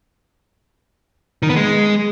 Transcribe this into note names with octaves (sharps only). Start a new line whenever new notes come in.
D#3
B3
G#3